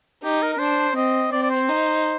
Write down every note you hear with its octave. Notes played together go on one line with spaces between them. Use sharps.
D#4 G4
A#4
A#4
D4 C5
C4 D#5
C4 D5
D5
C5
D#4